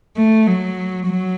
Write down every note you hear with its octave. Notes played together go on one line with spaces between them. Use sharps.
A3
F#3
F#3